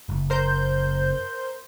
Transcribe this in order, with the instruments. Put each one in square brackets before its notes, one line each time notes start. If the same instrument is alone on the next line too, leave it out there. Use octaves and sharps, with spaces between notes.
[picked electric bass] F#1
[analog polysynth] A#4 C5 G6